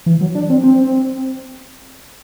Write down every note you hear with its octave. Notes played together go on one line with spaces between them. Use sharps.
E3
F#3
D4
C4
C4